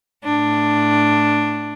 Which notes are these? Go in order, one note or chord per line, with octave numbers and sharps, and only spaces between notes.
A2 D4